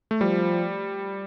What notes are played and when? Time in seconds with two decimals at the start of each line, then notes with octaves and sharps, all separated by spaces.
0.11 A3
0.20 F3 G3